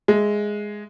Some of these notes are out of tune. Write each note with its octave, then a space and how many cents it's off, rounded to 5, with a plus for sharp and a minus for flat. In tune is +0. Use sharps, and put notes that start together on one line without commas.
G#3 +0 E5 +10